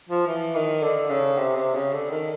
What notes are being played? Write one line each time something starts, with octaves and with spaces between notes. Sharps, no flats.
F3
E3
D#3
D3
C#3
C3
C3
C#3
D3
D#3